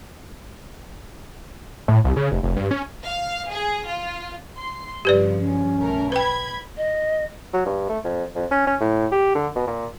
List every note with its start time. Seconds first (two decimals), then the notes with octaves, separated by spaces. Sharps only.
1.88 A2
2.04 C2
2.16 C#3
2.32 F1
2.43 F1
2.56 G2
2.71 C#4
3.05 F5
3.51 G#4
3.86 F4
4.59 C6
5.05 G2 C#3 F3 G4 B4 D5
5.41 C#4
5.80 B1 A3 A#4
6.12 B4 G5 B5 G#6
6.77 D#5
7.54 F#3
7.66 G2
7.89 A3
8.05 F2
8.36 F2
8.51 C#4
8.67 C#4
8.81 A2
9.12 G4
9.35 D3
9.55 B2
9.67 A#2